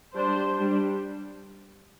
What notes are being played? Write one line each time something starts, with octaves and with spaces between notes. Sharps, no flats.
G3 D4 C5
G3 D4